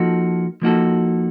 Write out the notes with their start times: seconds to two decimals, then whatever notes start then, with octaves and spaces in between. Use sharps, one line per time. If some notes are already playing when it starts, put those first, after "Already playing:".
Already playing: F3 A#3 D#4 F#4 A4
0.62 F3 A#3 D#4 F#4 A4